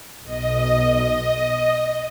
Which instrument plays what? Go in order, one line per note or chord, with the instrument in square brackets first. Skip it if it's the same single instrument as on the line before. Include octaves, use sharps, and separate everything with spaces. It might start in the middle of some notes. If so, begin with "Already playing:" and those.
[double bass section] B1 [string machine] D#5